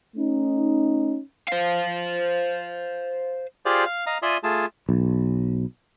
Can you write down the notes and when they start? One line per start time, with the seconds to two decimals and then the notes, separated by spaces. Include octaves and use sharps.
0.16 A3 C#4 D#4
1.48 C5 F5
3.66 F4 G4 G#4 C5 D5 F5
3.85 F5
4.07 D#5 F5 A#5
4.22 F4 D5 E5 G#5 C6 D#6
4.43 A3 F4 G#4 A5
4.89 B1